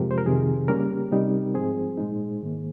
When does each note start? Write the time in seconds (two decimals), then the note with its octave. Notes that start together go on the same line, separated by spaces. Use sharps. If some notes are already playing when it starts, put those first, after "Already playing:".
Already playing: F2 C3 F3 G#3 G4 A#4
0.11 C5
0.18 A#4
0.26 F2 C3 D#3 G#4
0.68 C#3 G3 A#3 C#4 G4 A#4
1.11 C3 G3 C4 D#4
1.54 G#2 F3 C4 G#4 C5
1.98 A#2 G#3 D#4
2.41 G#2 D#3 A#3